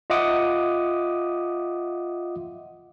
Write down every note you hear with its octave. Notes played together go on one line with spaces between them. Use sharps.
F4 D#5 E5 F#5 D6 D#6